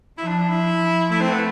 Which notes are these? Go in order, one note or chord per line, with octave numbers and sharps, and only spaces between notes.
F3 E4
D4
D4
E4
F3
A3 E4
C4
B3